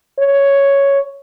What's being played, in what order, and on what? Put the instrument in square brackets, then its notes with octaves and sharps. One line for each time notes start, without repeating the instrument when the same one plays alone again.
[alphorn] C#5